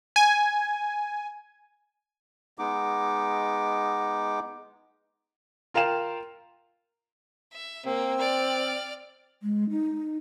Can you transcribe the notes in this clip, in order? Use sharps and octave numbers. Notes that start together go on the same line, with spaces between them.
G#5
G#3 B3 D#4 D6
F4 A#4 F5 G5 E7
E5
A#3 C4
D5 F6
G#3
D#4